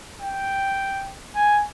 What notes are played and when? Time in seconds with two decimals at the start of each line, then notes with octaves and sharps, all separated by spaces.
0.21 G5
1.35 G#5